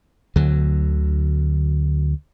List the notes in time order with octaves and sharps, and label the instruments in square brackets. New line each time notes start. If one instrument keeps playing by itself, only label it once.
[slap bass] D2 D3 F#3